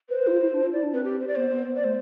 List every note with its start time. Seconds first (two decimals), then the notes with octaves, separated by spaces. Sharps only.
0.09 B4 C5
0.19 B4
0.27 E4
0.30 F4
0.41 E4
0.52 D4
0.63 F4
0.73 E4 D5
0.83 D4
0.93 C4 B4
1.04 G4
1.20 C5
1.28 D5
1.36 B3 C5
1.52 B3
1.68 B3
1.76 D5
1.83 A3 C5